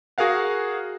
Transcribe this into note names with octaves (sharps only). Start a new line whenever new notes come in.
F#4 G#4 A#4 F5 F#5